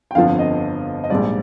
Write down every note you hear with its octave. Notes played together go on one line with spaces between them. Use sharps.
G5
G1 F2 D3 F3 F5
D#5
D#5
A#1 G#2 G3 D5